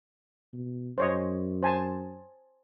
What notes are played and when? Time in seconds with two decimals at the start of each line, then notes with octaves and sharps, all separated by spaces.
0.53 B2
0.98 F#2 C5 C#5 D#5
1.63 C5 G#5 A5